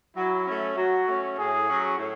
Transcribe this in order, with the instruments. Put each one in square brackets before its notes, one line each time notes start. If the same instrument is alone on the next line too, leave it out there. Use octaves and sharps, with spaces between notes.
[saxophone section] F#3 [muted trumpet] E4
[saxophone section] A3 C#4
[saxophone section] F#3 [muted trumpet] F#4
[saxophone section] A3 C#4
[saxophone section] A2 [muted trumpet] G#4
[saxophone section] F#3 C#4 F#4
A2